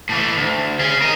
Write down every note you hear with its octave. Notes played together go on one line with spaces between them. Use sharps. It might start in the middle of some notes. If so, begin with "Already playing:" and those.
A2 E3
D2
C#4 G#4
A#4 D#5